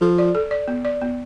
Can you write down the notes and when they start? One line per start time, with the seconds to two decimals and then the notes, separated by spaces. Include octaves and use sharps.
0.01 F3 A4
0.18 D5
0.35 A4
0.51 D5
0.68 B3
0.85 D5
1.01 B3